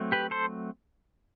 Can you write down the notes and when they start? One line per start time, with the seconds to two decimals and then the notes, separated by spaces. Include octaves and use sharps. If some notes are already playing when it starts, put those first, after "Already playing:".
Already playing: F#3 A3 C4
0.12 G4 B4
0.31 A4 C5